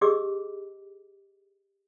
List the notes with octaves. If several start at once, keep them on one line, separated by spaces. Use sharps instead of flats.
G4 G#4 D#5 D6 E6